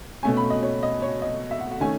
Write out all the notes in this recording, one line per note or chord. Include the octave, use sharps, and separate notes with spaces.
B2 A3 C#4 G#5
B5
D#5
C#5
D#5
C#5
D#5
E5
F#5
F#5
D#3 A3 C#4 G#5